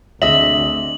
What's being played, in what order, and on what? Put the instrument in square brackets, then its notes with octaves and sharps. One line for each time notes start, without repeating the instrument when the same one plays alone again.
[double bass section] D2 [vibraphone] C4 D4 [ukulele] G#4 D#5 E5 [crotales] F#7